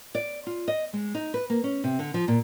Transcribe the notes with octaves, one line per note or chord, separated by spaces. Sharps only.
D5
F4
D#5
G#3
D#4
B4
A#3
C#4
C3
D3
F3
A#2